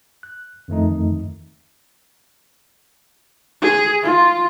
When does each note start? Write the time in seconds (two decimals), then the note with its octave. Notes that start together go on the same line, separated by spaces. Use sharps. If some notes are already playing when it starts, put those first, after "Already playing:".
0.23 F#6
0.68 F2 D#3 A3 D#4
3.62 G#4
4.03 F4